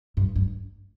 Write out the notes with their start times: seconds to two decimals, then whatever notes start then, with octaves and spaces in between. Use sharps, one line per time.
0.17 G2
0.36 G2